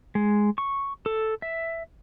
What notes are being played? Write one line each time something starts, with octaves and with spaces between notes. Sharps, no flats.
G#3
C#6
A4
E5